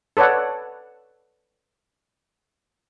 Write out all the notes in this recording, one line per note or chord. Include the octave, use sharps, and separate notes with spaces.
A4 B4 C#5 D5 F#5